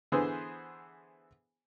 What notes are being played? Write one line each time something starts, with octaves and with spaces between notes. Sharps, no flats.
D3 E3 B3 G#4 C5